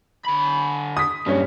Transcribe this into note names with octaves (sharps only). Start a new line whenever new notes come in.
D3 B5
D#6 B6
G2 A#2 F#3 C#4